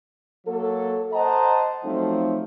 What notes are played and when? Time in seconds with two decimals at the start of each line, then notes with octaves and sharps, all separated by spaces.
0.47 F#3 A#3 A4
1.13 C5 D#5 F#5 A5 A#5
1.84 F3 F#3 A3 C4 D#4